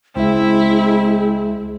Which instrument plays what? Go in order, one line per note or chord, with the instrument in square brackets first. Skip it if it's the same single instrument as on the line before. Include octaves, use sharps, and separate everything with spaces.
[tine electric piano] C#2 E5 [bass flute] G#3 [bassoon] C4 [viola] E4